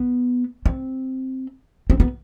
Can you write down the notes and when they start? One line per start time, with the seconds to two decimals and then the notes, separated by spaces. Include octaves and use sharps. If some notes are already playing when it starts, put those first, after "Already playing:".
Already playing: B3
0.66 C4
1.90 C4
2.00 B3